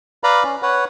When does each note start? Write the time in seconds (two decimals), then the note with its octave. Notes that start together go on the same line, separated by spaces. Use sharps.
0.24 B4 D5 F5 A#5 B5
0.43 C#4
0.62 B4 C#5 F#5